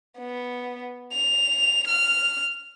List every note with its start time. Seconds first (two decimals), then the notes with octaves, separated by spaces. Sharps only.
0.19 B3
1.12 F7
1.87 F6